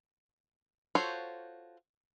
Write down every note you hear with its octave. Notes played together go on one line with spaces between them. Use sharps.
F4 F#4 A4 C5 C#5